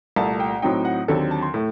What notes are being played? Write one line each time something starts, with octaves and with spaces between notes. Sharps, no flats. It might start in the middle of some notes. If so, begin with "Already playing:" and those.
C2 A#2 A3 A5
G5
A2 F#3 C4 D#4 G5
F#5
D#2 D3 F#3 C4 A4
A5
C6
A2 A3